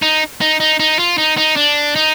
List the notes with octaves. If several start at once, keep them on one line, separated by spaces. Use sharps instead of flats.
D#4
D#4
D#4
D#4
F4
D#4
D#4
D4
D#4